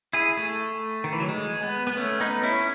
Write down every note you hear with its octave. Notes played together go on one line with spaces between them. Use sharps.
E4 G#4
A3
D#3
E3
F#3
G#3
B3
B3
A3 C#4
B3 D#4
C#4 E4